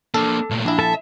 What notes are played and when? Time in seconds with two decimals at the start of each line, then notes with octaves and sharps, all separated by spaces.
0.14 A#3 D4 A4
0.50 A#2 A3
0.66 A#1 D4 E4
0.79 A4 E5 A5